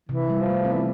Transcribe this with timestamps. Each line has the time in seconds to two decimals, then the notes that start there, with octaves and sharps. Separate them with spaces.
0.09 C3 E3
0.30 G3
0.40 F3
0.50 A3
0.65 C4
0.71 E3 B3